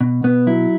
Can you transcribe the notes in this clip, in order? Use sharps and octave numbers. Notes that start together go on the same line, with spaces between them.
B2
B2 B3
F#3 E4